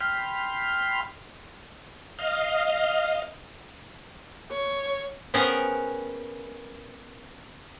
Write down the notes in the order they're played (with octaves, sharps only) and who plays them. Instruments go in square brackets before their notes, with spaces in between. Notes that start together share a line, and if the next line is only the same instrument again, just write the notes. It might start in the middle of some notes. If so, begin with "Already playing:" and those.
[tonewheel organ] G5 B5 C6 F6
D#5 F5
[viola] C#5
[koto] B3 C#4 G#4 A#4 C5 G5